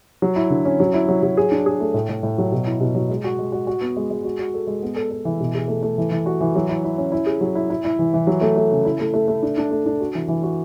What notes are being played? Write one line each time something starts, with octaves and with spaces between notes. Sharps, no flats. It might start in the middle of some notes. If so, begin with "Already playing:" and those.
F#3
E4
D3
C#4
F#3
E4
F#3
F#3
G#4
D4
G#4
A3
A2
A2
A2
F#3
B2
E4
B2
F#3
G#3
F#4
G#3
F#4
F#4
B3
G#3
G#3
F#4
F#4
A4
G#3
B3
A4
A4
E3
B2
G#4
A3
A3
E3
E3
F#4
E3
F#3
E4
E4
C#4
E4
G#4
F#3
E4
E4
E4
E3
E3
F#3
A3
A3
C#3
E4
A3
A3
A3
D4
D4
A3
D4
F#4
E3
E3
F#4